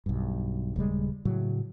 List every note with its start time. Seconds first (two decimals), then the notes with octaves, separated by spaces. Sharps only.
0.06 B1 G2
0.76 D#1 C#3 G3 G#3
1.25 A2 C#3 F#3